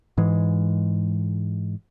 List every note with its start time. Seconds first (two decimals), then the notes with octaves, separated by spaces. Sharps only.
0.18 G#2 E3 G#3